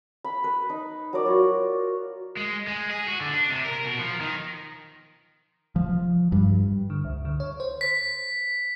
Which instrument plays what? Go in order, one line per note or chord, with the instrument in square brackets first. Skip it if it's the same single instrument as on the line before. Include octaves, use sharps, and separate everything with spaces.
[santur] B5
B4
D#4
F#3 A#4 D5
F4 F#4 C#5
[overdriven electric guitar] G#3
G#3
G#4
F#4
D3
D4
C3
A#4
B2
F3
D#3
[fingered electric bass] F3
G2
[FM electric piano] D3
C#2
D3
C#5
C5
[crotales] B6